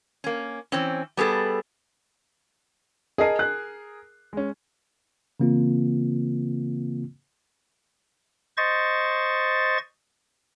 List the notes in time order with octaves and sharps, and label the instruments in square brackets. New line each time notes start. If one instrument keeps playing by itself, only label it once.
[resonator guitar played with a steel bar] A#3 C#4
E3 C4 C#4
G3 B3 G#4 A4
[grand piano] G#4 A#4 D#6 [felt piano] D#5 A5 C7
[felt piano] F#6
[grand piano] G#3 C#4
[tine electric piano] C#3 E3 A#3 C4 F4
[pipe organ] C5 D#5 C#6 A6